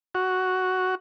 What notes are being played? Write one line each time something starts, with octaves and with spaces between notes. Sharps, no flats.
F#4